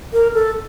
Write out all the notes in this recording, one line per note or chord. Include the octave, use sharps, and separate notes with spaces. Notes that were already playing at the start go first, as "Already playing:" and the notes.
A#4
A4